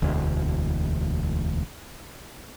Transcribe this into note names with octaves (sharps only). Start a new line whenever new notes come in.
E1 D2